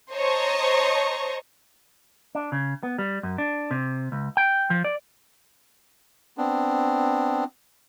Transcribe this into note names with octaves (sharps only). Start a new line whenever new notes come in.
C5 C#5 D#5 A5 A#5 C#6
D4
C#3
B3
G3
F#2
D4
C3
C#2
G5
F3
D5
B3 C4 D4